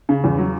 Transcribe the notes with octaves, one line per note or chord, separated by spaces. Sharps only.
C#3
E2
F#3